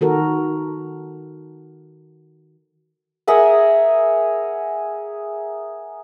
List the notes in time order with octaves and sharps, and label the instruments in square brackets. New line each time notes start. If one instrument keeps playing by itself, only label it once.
[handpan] D#3 F#4 A4 A#4
[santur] G#4 A#4 E5 F#5